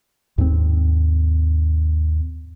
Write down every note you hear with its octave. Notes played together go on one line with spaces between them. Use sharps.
D#2 G#2 G3 C4